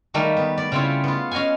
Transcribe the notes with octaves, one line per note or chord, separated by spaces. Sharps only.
D#3 G3 A3 A#3
B3
D5
C#3 G3 C4 E4 F4 C#5
B3 F4
C#4 D#5 F5 F#5 G#5